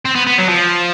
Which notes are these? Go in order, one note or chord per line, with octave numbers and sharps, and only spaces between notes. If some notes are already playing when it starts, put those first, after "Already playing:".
C4
B3
B3
F#3
F3